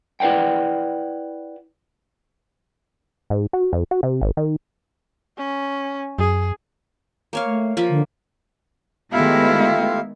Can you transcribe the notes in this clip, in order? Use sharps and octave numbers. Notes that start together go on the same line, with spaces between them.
E4 B4 D5 F#5 G5
G#2
F#4
F2
F#4
C3
G#1
D#3
C#4
F#2 G#4
A#3 C#5 F5
A3
F3 A#3 B5
D3
D#3 G#3 A3 B3 E4 F4 G4 F5